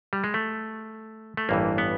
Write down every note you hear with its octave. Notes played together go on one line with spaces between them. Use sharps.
G3
G#3
A3
A3
A1 G2 E3 A#3
B3